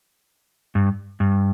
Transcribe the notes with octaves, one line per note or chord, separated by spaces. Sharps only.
G2
G2